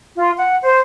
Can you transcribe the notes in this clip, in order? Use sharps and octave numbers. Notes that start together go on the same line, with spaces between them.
F4
F#5
C5